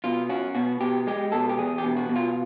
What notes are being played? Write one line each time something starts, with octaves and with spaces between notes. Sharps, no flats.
B2 F4
C#4 F#4
B2 F#4
B2 G4
G#3 G4
B2 A4
G4
E2 G#4
G4
B2
F#4
B2
F4